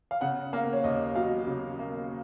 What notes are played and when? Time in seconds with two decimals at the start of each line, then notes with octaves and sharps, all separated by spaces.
0.11 F5
0.21 C#3 F#5
0.53 A#3 F5
0.73 C#5
0.84 D#2 D#5
1.15 F#3 F5
1.47 C#3
1.79 A#3